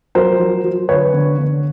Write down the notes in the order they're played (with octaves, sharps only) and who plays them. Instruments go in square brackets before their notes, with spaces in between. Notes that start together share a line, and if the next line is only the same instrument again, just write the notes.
[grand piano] F#3 A#4 C5
F#3
F#3
D3 B4 C#5
D3
D3